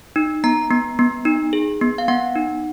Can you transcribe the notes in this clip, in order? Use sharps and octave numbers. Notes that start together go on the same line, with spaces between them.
D#4
B3 A#5
B3
B3
D#4
G#4
B3
F5
B3 F#5
D#4